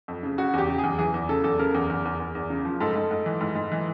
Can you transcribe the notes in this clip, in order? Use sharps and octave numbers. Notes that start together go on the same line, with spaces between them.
F2
C#3
C#3 F#4
E2 G4
C#3
G#4
E2
E3 G#4
E2
C#3 A4
E2 A4
C#3 A#4
E2
E2
E2
E2
E2
C#3
F3
G#2 A4
G#2
G#2
E3
G#2
G#2
E3